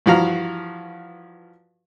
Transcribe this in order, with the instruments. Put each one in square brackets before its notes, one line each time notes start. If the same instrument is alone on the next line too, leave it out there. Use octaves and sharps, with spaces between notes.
[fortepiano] G2 E3 F3 F#4 F5 A#5